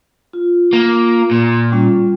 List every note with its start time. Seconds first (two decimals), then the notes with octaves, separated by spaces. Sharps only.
0.33 F4
0.73 A#3
1.31 A#2
1.72 G3 C#4 F4